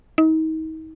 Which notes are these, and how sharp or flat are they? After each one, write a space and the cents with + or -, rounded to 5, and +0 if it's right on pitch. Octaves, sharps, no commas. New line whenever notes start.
D#4 +35